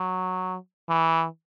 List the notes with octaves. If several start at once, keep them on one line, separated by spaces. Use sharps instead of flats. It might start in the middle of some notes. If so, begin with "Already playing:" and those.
Already playing: F#3
E3